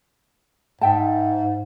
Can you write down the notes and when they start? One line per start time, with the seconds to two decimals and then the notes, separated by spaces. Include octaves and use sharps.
0.81 G#2 E5 G5 A5